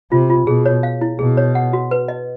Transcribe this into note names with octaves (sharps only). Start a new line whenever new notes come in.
C3 F4
F4
B2 G#4
C#5
F5
E4
B2 G#4
C#5
F#5
F#4
B4
D#5